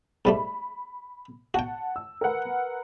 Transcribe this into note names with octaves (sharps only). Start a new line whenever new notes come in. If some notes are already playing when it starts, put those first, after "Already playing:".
G#2 G3 A3 B5
F#4 F#5 G5 A5
E6
A#4 B4 F#5